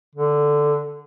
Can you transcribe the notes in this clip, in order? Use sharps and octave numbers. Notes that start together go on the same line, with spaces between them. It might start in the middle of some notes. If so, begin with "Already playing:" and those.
D3